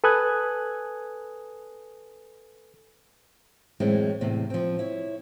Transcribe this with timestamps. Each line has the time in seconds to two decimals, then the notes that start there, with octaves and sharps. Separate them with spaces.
0.04 A4 B4 G#5 D#6 F#6 G#6
3.80 F#2 A2 E3 G#3 C4
4.21 E2 A2 C3
4.50 F3 C4
4.79 E4 C#5